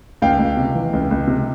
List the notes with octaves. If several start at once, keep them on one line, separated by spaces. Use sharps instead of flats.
C#2 F5 G5
C#2
C3
E3
C#2
C#2
C3